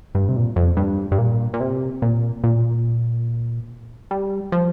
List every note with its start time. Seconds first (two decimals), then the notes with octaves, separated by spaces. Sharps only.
0.15 G2
0.29 C3
0.36 A#2
0.56 F2
0.77 G2
1.12 G2
1.19 A#2
1.54 A#2
1.60 C3
2.02 A#2
2.44 A#2
4.11 G3
4.52 F3